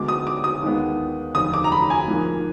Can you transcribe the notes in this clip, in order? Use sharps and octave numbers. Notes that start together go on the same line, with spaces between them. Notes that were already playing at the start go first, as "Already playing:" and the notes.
Already playing: D2 D3 G#3 B3 D6
D#6
D6
D#6
D#2 D#3 G#3 B3
F1 D#2 D3 D#6
D6
A#5
B5
G#5
G#2 F3 A#3